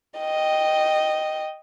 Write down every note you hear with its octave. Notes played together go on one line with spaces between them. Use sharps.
D#5 G5